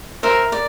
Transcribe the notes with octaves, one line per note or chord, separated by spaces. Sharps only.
A#4 C5 E5
D5